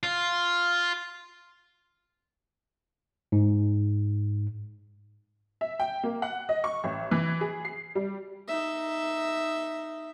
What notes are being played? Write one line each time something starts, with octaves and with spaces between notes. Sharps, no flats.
F4
G#2
E5
G5
A#3
F#5
D#5
C#6
A1
E3
G#4
C7
G3
D#4 E5